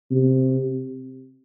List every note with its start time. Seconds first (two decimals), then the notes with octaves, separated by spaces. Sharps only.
0.11 C3